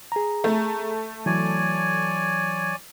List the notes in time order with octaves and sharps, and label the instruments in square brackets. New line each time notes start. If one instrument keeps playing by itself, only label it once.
[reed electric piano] G#4 A#5
[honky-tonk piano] A3
[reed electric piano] E3 F#3 [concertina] C#5 D5 G#5